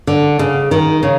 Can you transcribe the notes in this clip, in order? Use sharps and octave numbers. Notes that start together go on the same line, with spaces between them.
D3
C#3
D#3
C#3